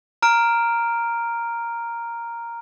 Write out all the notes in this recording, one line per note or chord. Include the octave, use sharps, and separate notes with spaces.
A#5 F6 D7